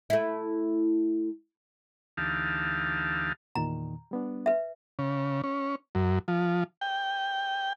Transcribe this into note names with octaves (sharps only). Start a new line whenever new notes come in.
A3 E4
D2 E3 D#4 G4 F5 A5
E2 A#2 D#3 A#5
G3 B3 D4
B4 E5
C#3
C#4
F#2
F3
G5